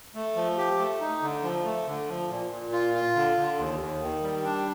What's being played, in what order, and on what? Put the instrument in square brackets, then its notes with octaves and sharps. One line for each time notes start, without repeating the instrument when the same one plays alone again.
[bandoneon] A3
F3
G4
A3
D#4
D3
F3
A3
D3
F3
A#2
A#2
F4
F4
D3
D3
D#2
D#2
D#3
G3
D4